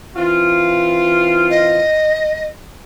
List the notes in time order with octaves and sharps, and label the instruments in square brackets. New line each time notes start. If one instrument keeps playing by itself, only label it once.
[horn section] E3 C4 F4
[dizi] D#5